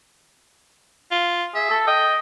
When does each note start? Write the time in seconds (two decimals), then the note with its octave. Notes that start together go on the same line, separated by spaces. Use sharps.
1.11 F4
1.55 G#4 E5
1.70 A4
1.87 D#5 G5